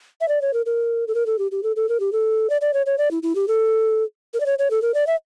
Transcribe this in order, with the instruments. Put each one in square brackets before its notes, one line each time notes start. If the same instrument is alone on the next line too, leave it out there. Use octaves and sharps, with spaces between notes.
[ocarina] E5
D5
C#5
A#4
A#4
A4
A#4
A4
G4
G4
A4
A4
A#4
G4
A4
D5
D5
C#5
C#5
D5
E4
E4
G4
A4
A#4
D5
C#5
C#5
A4
A#4
D5
E5